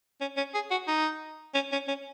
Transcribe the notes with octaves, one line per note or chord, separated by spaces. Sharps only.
C#4
C#4
G#4
F#4
D#4
C#4
C#4
C#4